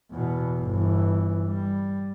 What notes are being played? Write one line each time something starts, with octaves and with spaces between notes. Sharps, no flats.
E2 B2
G1 E3
G3